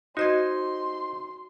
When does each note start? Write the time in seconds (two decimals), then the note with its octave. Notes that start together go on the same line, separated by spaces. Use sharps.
0.17 D#4 F#4 C5 D#5 C6 G#6